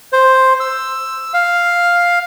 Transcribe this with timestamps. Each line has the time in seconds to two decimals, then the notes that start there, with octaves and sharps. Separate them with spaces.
0.13 C5
0.60 E6
1.34 F5